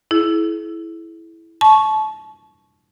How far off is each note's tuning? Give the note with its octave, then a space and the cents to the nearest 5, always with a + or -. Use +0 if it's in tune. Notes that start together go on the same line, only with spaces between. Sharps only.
E4 +0 G#4 +45
A5 -25 C#6 +0